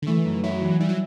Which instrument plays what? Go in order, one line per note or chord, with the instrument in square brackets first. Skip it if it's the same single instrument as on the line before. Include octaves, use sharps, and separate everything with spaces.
[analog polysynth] D3
[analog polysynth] E3 [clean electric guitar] A3
[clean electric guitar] F#2
[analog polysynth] F#3 [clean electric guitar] E4
[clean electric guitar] E3
[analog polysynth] G3 [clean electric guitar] E4
[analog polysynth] F#3